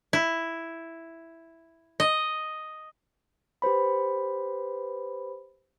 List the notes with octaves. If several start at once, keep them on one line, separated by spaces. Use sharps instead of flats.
E4
D#5
G4 B4 C5 B5